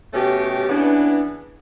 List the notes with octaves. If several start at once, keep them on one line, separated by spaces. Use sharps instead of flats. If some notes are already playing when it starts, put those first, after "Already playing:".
B2 A3 C#4 G4
C#3 E3 B3 D4